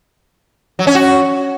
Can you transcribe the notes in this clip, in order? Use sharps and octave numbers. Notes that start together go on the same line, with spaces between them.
F#3
C#4
F#4